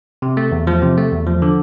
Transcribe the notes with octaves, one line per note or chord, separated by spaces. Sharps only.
C3
A3
E2
F3
C3
A3
E2
F3
D3